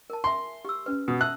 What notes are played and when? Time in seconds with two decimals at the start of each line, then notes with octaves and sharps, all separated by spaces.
0.10 A#4 A5
0.24 E5 G#5 C6
0.65 G4 E6
0.86 C#4 B4
1.08 B2 D#6
1.21 E5 A5 E6 F#6